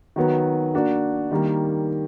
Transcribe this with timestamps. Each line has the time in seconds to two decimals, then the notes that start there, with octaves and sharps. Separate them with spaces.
0.16 D#3 F#3 B3
0.74 A#3 D4 F#4
1.31 D#3 G3 A#3